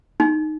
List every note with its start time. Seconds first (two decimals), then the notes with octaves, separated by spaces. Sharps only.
0.20 D#4